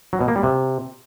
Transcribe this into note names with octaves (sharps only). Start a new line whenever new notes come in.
F#3
B2
A#3
G3
C3